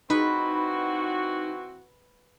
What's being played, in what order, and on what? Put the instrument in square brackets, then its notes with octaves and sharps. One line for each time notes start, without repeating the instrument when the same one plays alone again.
[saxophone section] E3 C4 F#4 [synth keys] D#4 [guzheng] B4